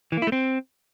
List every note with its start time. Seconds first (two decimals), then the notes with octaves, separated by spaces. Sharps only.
0.12 E3
0.17 A#3
0.22 E4
0.27 A3
0.32 C4